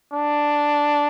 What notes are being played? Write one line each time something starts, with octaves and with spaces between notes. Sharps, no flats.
D4